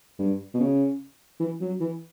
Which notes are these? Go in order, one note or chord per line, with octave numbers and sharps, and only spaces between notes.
G2
B2
C#3
E3
F#3
E3